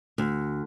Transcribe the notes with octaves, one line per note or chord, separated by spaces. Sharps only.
D2